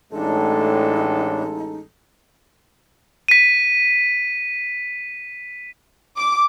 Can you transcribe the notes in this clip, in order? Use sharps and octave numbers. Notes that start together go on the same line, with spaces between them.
A1 A2 G#3 D4 D#4 A4
B6 D#7
D6